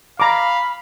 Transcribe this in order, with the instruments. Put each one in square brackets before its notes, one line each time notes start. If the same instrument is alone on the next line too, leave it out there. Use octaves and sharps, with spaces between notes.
[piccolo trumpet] F5 [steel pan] A#5 D6 [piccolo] B5